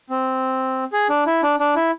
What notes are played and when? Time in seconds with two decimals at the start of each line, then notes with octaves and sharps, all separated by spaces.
0.10 C4
0.93 G#4
1.09 D4
1.26 E4
1.43 D4
1.60 D4
1.76 E4